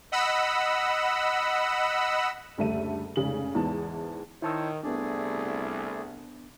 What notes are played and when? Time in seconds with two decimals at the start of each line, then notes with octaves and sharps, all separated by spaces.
0.12 D#5 F#5 B5 E6
2.58 F#1 D2 G3 A3 E5 D#7
3.16 F1 G#2 C#3 F#7
3.55 E2 G#2 E3 B3 A5
4.42 D#3 E4 C5 C#5 A5 E6
4.83 C2 A3 B3 D4 G#4 D5